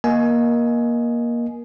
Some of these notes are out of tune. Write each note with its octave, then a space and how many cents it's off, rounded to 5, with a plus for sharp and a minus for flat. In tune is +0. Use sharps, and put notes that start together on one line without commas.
A#3 +20 D#5 +0 G#5 +20